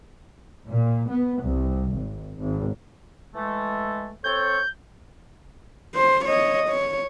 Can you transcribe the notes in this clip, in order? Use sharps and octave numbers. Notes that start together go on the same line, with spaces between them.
A#2
B3
C2
G#1
G#1
E3 G#3 A3
C4 A4 C#5 G6
C5
C#5 D#5
C#5